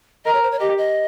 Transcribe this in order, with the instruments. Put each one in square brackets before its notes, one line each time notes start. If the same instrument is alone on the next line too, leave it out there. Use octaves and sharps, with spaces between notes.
[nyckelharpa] A#4 [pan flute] D#5
[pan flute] C#5
C5
C#5
[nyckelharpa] G4 [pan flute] D#5
[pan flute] D#5